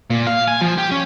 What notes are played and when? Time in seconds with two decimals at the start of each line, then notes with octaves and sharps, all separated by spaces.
0.10 A#2
0.27 F5
0.48 G#5
0.61 F3
0.78 G4
0.91 C#4